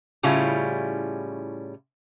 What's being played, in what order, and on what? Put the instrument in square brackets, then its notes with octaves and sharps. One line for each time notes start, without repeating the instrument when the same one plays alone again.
[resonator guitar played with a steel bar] A2 C#3 G3 C#4 E4 F4